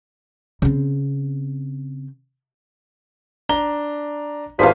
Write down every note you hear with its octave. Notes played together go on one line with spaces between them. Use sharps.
C#3 C4
D4 A#5 G7
G#1 E2 G2 F3 F5 B6